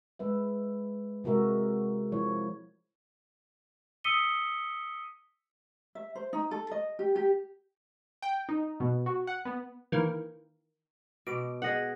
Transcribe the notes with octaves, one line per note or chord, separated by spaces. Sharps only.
G#3 B4 E5
C3 G#3 F#4 A#4 E5
F3 E4 C#5
D#6 E6 B6 C#7 D#7 G7
E5
C5
D#4
A4
D#5
G4
G4
G5
D#4
B2
F#4
F#5
B3
D#3 E3 A#3
B2 D6
G#4 D#5 F#5